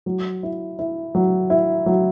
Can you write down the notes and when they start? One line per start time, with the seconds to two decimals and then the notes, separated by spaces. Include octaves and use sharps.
0.06 F#3
0.43 E4
0.79 E4
1.15 F#3
1.50 E4
1.86 F#3